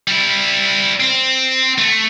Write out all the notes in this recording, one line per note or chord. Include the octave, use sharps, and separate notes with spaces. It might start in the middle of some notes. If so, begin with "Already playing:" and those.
G3 E4
C4
A3